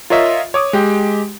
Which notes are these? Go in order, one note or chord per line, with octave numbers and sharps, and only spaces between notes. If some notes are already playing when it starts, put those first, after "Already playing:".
F4 A#4 C#5 D#5 E5
C#5 D6 D#6
G#3 G4 G5